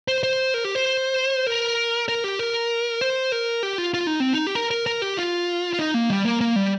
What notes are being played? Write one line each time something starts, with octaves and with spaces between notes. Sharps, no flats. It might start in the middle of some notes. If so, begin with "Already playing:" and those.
C5
C5
A#4
G4
C5
A#4
A#4
G4
A#4
C5
A#4
G4
F4
F4
D#4
C4
D#4
G4
A#4
A#4
A#4
G4
F4
F4
D#4
A#3
G3
A#3
A#3
G3